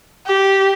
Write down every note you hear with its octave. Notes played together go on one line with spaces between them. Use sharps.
G4